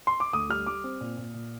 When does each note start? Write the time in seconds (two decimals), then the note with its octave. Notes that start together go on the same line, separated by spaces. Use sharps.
0.07 C6
0.20 D6
0.33 D2 D#6
0.49 G3 F6
0.66 G3 D6
0.84 C4
1.01 A#2
1.18 A#2
1.34 A#2